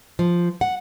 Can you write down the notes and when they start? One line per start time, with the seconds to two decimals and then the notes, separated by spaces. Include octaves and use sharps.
0.19 F3
0.61 F#5